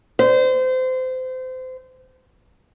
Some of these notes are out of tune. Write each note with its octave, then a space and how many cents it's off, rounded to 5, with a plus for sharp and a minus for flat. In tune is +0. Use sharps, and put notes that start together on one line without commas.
C5 -25